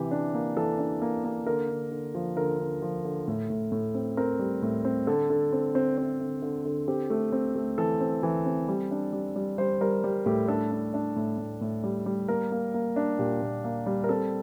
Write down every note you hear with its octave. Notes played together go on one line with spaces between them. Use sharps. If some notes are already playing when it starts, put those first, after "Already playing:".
Already playing: C3 E3 G4
D4
A#3
E3 A4
D4
A#3
A#3
D3 A#4
D3
D3
F3
D3 A#4
D3
F3
D3
A2
A2
A2
C4
C4 A#4
G3
A2
C4
D3 A4
D3
C4
C4
C4
D3
D3
D3
C4 G4
A3
C4
A3
E3 A4
C4
E3
C4
G3
D4
G3
G3
G3 C5
G3 A#4
G3
A2 G4
D4 A4
D4
D4
A2
A2
A2
G3
G3
A#3 A#4
A#3
A#3
D4
A#2 G4
A#2
A#3
G3
A#4
C4 A4